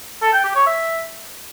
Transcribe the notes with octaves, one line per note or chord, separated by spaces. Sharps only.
A4
G5
G4
C#5
E5